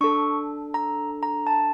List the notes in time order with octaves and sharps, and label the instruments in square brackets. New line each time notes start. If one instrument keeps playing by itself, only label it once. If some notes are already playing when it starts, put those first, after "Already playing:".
[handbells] D4 A4 C#6
A#5
A#5
A5